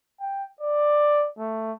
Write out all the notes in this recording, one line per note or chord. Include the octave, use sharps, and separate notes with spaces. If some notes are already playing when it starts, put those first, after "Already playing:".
G5
D5
A3